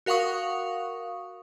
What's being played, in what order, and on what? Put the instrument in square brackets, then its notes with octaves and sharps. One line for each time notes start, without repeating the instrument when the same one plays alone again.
[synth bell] F#4 A#4 F5 F#5 C#6 D#6